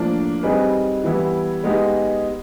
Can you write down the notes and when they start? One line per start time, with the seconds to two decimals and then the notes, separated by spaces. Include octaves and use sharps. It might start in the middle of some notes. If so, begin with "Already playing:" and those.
Already playing: A2 F3 A#3 D4
0.43 G3 C4 D#4 G#4 B4
1.04 E3 G3 B3 E4
1.64 G#3 B3 D#4 G4